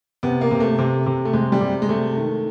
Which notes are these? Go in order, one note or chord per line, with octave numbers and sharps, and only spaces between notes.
C3 B3
A#3
C3
A3
C3
C3
A3
C3 G#3
G3
C3
G#3
C3 A3
D#3